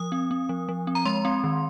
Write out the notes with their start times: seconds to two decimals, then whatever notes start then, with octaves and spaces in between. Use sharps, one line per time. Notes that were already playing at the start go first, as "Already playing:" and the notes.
Already playing: F3 D#6
0.12 C4
0.31 C4
0.49 F3
0.69 F3
0.87 C4
0.95 A#5
1.05 G#3 C6
1.25 C4
1.44 D#3